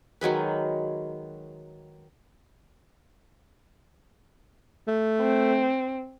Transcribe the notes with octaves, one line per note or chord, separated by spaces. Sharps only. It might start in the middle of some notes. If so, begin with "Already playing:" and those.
D#3 F#3 G#3 B4
A3
C4